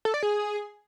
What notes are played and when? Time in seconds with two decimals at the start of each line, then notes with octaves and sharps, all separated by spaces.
0.05 A4
0.14 D5
0.23 G#4